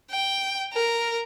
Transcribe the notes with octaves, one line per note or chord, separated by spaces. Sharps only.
G5
A#4